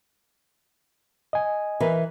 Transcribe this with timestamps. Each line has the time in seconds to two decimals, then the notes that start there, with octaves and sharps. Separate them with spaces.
1.33 D#5 G#5
1.80 E3 A#4 B4